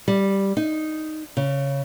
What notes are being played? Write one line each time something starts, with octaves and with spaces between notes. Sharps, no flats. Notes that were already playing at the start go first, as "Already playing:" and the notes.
G3
D#4
C#3